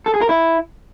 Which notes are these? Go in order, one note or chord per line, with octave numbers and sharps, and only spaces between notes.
A4
G#4
A#4
E4